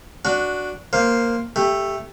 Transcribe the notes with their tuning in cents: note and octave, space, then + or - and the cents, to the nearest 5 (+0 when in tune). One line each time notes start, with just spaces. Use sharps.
D4 -5 F#4 -5
A#3 +0 C5 +0
A3 +0 G4 +10